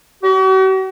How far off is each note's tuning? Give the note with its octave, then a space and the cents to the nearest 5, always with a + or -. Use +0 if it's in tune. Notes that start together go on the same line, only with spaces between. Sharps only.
F#4 +45